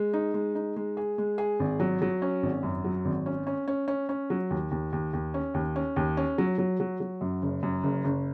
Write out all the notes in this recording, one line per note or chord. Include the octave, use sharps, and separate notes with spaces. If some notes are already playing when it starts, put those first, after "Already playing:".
Already playing: G#3
D#4
G#3
D#4
G#3
G#4
G#3
G#4
G#1
F#3
F#3
C#4
G#1
F#2
F#3
G#1
C#4
C#4
C#4
C#4
C#4
F#3
D#2
D#2
D#2
D#2
C#4
D#2
C#4
D#2
C#4
F#3
F#3
F#3
F#3
F#2
F#1
F#2
F#1
F#1